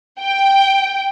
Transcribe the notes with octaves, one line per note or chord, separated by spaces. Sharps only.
G5